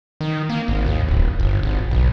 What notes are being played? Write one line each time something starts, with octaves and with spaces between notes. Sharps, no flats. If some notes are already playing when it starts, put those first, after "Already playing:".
D#3
A#3
G#1
D#2
D1
G1
G#1
B1